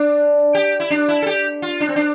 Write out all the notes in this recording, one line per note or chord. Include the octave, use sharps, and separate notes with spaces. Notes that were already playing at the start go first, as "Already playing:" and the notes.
Already playing: D4
G4
E4
D4
E4
A4
G4
F4
D4
C4
D4